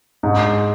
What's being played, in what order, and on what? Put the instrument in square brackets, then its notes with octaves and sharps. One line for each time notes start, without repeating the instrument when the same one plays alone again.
[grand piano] G#2